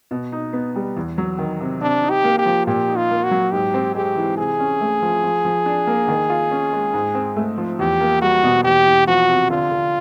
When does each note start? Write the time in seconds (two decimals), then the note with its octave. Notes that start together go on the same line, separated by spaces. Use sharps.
0.11 B2
0.32 D#4
0.53 B3
0.76 G3
0.97 E2
1.18 F#3
1.38 D#3
1.60 C3
1.81 C3 D4
2.03 D#4
2.10 G4
2.24 A#3
2.38 G4
2.46 F3
2.67 A#2 G4
2.88 D#4
2.96 F4
3.10 A#3
3.24 F#4
3.31 F#3
3.52 G#2 G4
3.74 C4
3.95 G#3 G4
4.16 E3
4.37 C3 G#4
4.59 C#4
4.81 A3
5.02 F3
5.24 F3
5.45 F3
5.66 D4
5.87 A#3
6.08 D#3
6.30 F4
6.51 C#4
6.73 G#3
6.94 G#2
7.15 C4
7.36 A3
7.58 F3
7.79 E2 G4
8.01 A#3
8.22 G3 F#4
8.44 B2
8.64 E2 G4
8.86 E2
9.07 F3 F#4
9.29 C3
9.50 D3 F4
9.72 D3